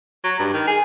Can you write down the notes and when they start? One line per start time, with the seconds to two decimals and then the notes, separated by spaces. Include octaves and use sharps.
0.24 F#3
0.40 G2
0.54 D#3
0.68 G#4